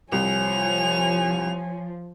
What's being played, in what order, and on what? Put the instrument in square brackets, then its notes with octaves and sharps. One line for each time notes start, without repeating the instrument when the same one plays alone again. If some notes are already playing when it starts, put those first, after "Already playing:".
[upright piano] C2 [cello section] F3 [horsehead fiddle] C#5 G#5 [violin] F7